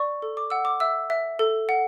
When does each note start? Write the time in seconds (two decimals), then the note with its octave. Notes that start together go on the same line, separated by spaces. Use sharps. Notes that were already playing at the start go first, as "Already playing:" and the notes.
Already playing: D5 C#6
0.22 A4
0.37 D6
0.50 F#5 E6
0.65 D6
0.80 E5 E6
1.10 E5
1.39 A4
1.69 F#5